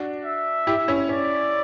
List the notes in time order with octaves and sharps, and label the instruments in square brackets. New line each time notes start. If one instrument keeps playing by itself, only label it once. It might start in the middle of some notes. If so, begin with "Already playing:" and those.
Already playing: [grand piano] D4 F#4
[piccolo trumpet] E5
[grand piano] E4 G4
C#4 E4
[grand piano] C#4 [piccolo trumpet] D5